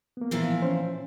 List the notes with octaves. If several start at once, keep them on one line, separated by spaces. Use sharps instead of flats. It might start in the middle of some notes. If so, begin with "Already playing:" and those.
A#3 B3
A#2 E3 F3
C#4 C5